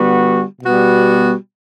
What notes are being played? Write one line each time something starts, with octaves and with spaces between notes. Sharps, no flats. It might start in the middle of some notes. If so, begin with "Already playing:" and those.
Already playing: D3 G3 B3 F#4
B2 G3 B3 F#4